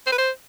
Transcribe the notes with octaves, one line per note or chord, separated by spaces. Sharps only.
C5
B4
C5